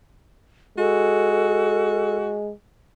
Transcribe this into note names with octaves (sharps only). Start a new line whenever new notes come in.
G#3 F#4 A4